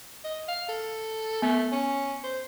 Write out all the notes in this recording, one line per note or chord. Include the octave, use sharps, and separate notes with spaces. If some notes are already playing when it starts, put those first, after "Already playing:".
D#5
F5
A4
A3 B3
C#4
C5